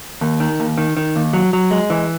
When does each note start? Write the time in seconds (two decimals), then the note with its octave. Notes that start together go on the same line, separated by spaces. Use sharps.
0.21 D#2
0.40 D#3
0.60 D#2
0.78 D#3
0.97 D#3
1.16 D#2
1.33 F#3
1.53 F#3
1.71 G#3
1.90 E3